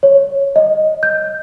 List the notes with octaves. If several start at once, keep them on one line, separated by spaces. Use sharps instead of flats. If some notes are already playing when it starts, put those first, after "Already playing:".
C#5
D#5
G6